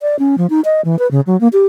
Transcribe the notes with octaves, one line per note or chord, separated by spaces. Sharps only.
D5
C#4
F3
D#4
D#5
E3
B4
C#3
F#3
A#3
G4